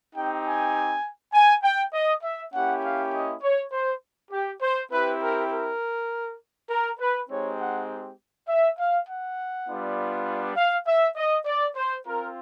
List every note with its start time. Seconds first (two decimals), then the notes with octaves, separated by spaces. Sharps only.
0.14 C4 D#4 G4 G5
0.45 G#5
1.33 G#5
1.63 G5
1.94 D#5
2.23 E5
2.53 A#3 C#4 E4 G4 F#5
2.83 F5
3.12 D#5
3.42 C#5
3.72 C5
4.31 G4
4.61 C5
4.91 C4 E4 G4 B4
5.21 A#4
5.51 A#4
6.70 A#4
6.99 B4
7.30 G#3 C4 D#4 G4 C#5
7.59 F#5
8.49 E5
8.79 F5
9.08 F#5
9.68 G3 B3 D4 F4
10.56 F5
10.87 E5
11.16 D#5
11.46 D5
11.76 C5
12.06 C4 F4 A#4